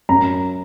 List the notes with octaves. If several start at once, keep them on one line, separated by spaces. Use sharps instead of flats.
F#2 A#5